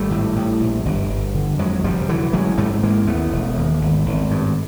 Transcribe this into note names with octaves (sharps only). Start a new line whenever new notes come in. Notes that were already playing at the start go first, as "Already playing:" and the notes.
Already playing: G#1 G3 A3
A2
A2
A#1
G1
G1
D3
F2 F#3 G#3
F1 F3 G3
D3 E3 F#3
A1 F#3 G#3
G#2 G3 A3
A1 G#3 A#3
D#2 A3 B3
E1
D#2
G#1
G#1
G2